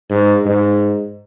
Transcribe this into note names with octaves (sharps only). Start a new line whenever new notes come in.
G#2
G#2